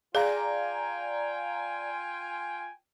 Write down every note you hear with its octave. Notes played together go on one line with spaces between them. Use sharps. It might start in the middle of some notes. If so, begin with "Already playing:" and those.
F4 G#4 D5 F5 G5 G#5 A#5